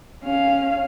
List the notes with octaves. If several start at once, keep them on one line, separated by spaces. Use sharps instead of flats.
C#4 F5